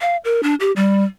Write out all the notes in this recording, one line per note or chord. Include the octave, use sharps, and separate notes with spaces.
F5
A#4
D4
G4
G3